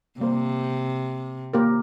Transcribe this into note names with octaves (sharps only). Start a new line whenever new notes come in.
C3 G3 A#3 G4 C5
A#3 G4 A#4